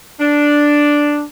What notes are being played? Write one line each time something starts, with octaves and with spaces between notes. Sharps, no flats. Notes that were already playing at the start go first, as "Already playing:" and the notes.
D4